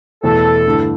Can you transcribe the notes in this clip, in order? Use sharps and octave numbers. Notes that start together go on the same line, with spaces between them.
E2 B2 A3 E4 A4
G2 D3 A3 E4